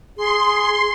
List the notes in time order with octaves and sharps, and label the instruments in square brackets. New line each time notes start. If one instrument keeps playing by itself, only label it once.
[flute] G#4 [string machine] C6